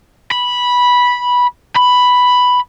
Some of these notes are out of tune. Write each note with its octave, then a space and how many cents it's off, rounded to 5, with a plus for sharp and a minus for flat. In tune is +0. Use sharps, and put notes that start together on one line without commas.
B5 -10
B5 +5